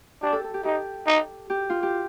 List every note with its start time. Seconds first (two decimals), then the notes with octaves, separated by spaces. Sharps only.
0.22 D4 G4
0.33 A4
0.44 A4
0.54 G4
0.65 D#4 G4
1.07 D#4
1.50 G4
1.70 F4
1.83 G4